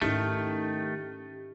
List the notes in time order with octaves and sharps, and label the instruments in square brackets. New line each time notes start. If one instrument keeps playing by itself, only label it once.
[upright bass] G#2 E4 [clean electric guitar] D#3 A3 [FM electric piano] C#4 D#4 G4